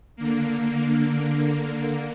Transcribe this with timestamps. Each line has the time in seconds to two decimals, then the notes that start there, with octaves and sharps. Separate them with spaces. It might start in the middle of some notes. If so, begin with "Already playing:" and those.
0.16 D3 A#3